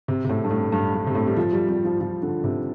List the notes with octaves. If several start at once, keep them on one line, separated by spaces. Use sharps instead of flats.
C3
C3
A2
G2
A2
G2
G2
C3
A2
G3
F3
G3
G3
F3
F3
D3
C3